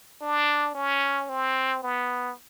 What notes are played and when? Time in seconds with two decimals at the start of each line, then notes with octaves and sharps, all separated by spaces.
0.22 D4
0.75 C#4
1.29 C4
1.83 B3